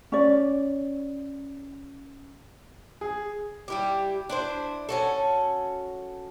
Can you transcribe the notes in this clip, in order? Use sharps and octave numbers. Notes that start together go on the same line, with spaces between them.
C#4 D5
G#4
G3 E4 G4
D4 E4 C5
C#4 F#4 A4